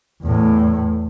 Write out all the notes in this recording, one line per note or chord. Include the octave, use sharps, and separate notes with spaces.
E2 A2